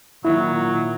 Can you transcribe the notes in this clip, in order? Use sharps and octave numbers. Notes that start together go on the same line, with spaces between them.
A#2 D#3 F#3 E4